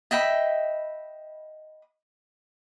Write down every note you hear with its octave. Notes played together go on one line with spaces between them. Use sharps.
D#5 E5 G5 B5